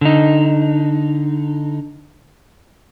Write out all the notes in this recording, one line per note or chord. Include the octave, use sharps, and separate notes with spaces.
D3 D#4